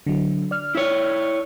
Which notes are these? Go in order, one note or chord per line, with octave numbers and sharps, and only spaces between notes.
D3 F#3
D5 F6
E4 C#5